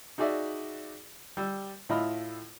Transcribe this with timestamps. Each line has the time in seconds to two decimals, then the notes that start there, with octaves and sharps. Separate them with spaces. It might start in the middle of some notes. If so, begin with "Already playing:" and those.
0.18 D#4 F#4 G#4 D5 E5
1.37 G3 E6
1.89 A2 E4 F4 D#5 B5 F6